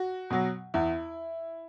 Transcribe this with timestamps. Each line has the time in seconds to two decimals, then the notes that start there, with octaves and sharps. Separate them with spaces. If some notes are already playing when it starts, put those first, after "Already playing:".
Already playing: F#4
0.30 B2 F#3
0.74 E2 E4